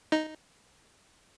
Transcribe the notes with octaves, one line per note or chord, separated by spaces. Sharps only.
D#4